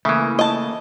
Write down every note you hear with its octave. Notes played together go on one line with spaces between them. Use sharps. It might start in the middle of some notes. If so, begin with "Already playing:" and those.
C#3 E3 A3 A#3 E4
D#5 A5